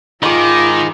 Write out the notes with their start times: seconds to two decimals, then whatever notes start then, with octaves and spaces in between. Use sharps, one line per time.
0.23 D#3 D#4 F4 G#4 B5 D6